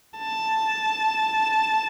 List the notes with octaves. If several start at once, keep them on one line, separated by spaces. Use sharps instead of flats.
A5